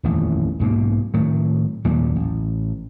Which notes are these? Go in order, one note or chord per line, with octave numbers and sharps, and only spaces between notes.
D#1 A1 F2
B1 G#2 B2 A#3
A2 D#3 F#3
D#2 A#2 F#3 G3
A1